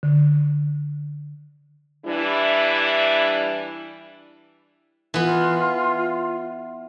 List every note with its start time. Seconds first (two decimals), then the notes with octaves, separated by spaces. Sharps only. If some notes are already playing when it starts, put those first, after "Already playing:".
0.03 D3
2.06 E3 G3 D4 E4
5.14 E3 B3 F4